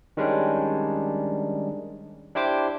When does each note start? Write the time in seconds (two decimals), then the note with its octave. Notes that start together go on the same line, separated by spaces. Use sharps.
0.17 D#3 G3 G#3 C#4 D4
2.35 D4 E4 G4 C5 D6